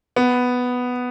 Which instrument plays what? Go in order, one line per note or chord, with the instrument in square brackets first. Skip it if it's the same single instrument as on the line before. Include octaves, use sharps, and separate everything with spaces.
[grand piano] B3